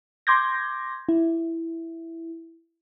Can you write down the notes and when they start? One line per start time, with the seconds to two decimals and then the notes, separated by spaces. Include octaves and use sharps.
0.27 C6 D6 G6 G#6 A#6
1.09 E4